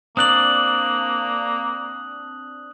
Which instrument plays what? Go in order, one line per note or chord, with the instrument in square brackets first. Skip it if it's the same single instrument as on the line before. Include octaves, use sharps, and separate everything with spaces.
[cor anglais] A#3 [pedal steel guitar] C4 D4 D5 [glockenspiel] D#6 F#6 F#7